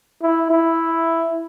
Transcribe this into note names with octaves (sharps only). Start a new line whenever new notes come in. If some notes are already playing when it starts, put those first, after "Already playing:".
E4
E4